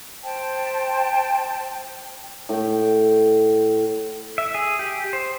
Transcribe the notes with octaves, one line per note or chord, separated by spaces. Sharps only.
C5 G5 A5
A2 G5
E5
G#4
G4
C5